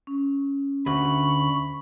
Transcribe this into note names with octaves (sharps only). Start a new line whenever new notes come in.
C#4
D2 B5 C#6